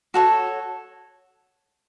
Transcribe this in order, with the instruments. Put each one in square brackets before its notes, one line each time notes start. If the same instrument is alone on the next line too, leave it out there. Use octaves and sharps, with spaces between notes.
[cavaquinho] F#4 A4 C#5